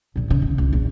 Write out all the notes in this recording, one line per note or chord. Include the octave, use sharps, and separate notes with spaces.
A#1 A#2
C#3
C#3
C#2
A#1 E2